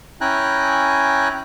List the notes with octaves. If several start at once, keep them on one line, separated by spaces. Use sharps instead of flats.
C#4 E4 G5 G#5 A#5 F#6